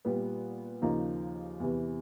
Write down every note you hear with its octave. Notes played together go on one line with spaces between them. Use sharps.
A#2 G3 B3
D#2 C#3 F3 A#3 D#4
E2 C3 E3